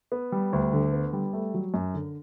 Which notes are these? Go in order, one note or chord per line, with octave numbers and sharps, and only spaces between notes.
B3
G3
D2
D3
B3
G3
A3
F#3
F#2
D3